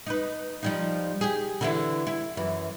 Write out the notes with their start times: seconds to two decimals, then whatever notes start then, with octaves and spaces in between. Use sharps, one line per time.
0.06 D#4 B4
0.63 F3 G3 D#4
1.21 G4 G#4
1.61 D3 E3 E4
2.07 E4
2.37 F#2 E3